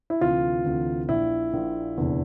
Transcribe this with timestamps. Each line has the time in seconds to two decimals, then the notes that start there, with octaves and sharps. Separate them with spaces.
0.10 E4
0.21 D2 C3 E3 F4
0.66 D2 C3 E3
1.09 A#1 A#2 E4
1.53 A#1 A#2
1.97 F1 E2 D3